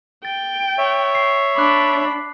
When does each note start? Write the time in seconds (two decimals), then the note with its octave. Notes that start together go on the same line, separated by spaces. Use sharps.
0.25 G5 A6
0.78 C#5 E5
1.15 C7
1.57 D4 B5 D6 F#6